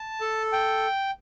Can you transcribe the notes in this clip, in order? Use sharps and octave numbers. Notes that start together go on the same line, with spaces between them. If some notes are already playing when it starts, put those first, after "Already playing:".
Already playing: A5
A4
G5